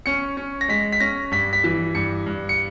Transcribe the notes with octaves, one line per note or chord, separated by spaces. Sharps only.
C#4 C#7
C#4
A#6
G#3 B6
B6
C#4 A#6
G2 B6
B6
E3
G2 C#7
G2
C#7